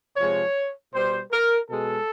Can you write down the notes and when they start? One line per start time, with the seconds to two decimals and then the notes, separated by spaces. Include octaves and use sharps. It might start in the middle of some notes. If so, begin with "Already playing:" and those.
0.17 C3 F3 G#3 C#5
0.93 B2 G3 C5
1.31 A#4
1.69 B2 G#3 A4